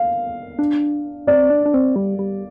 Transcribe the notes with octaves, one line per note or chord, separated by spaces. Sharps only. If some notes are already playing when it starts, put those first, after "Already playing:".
Already playing: F5
D4
C4 D5
D4
D4
C4
G3
G3